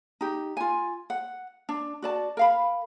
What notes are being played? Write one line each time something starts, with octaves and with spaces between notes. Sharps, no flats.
D#4 G4
F4 G#5
F#5
D4
F#4 D5 A5
A#4 F5 B5